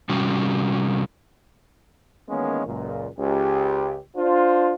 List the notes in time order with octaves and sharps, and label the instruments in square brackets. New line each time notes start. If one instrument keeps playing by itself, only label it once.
[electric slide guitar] C3 G3 C#4 F#4
[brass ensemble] D#3 E3 G#3 A#3 B3 C#4
C#2 F#2 A#2
C#2 G4
D4 F4 C5